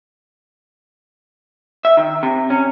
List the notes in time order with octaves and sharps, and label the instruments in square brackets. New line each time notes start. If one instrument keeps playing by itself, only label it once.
[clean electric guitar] E5
D#3
C3
C#4